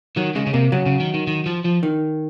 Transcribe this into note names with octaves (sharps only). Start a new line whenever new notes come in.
D#3 F#3
C#3 G#3
C#3
C3 A#3
C#3 F#3
C#3
D#3
D#3
D#3
F3
F3
D#3